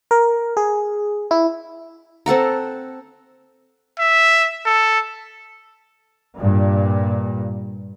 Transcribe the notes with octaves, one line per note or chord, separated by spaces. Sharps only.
A#4
G#4
E4
C4 A4 F#5 A#5
E5
A4
G2 A#2